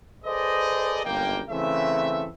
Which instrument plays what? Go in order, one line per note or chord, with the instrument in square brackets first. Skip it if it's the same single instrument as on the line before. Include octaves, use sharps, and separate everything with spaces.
[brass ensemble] G#4 A4 B4 C5 D5 D#5
G1 F#2 A#3 G5
C#3 E3 A3 C4 E5